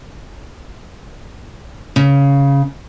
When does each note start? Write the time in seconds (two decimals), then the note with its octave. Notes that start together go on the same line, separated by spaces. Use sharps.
1.96 C#3